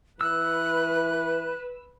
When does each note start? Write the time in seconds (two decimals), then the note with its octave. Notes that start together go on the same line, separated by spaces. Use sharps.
0.21 E3 B4 E6 F#6